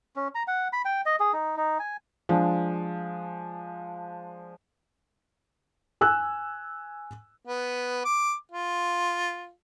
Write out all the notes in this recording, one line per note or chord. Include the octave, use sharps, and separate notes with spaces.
C#4
A#5
F#5
B5
G5
D#5
G#4
D#4
D#4
G#5
F3 G#3 D4
G#5 E6 F#6
B3
D6
F4